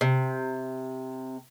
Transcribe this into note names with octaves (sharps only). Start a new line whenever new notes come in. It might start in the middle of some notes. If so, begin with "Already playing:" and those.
C3